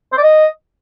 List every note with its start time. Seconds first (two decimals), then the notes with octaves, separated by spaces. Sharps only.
0.12 C5
0.18 D5
0.23 D#5